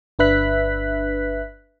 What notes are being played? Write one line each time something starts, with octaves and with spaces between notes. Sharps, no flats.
G1 D4 B4 E5 F#6 B6